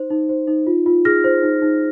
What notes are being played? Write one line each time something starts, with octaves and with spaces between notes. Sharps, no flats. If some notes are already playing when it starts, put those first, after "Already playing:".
Already playing: D#4 C5
D#4
C5
D#4
F4
F4
G#4 F6 A#6
C5
D#4
D#4